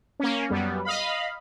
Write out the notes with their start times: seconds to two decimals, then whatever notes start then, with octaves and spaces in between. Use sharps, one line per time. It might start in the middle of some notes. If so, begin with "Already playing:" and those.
0.19 A#3 C#4
0.49 F#2 G3 B3
0.85 D#5 F5 B5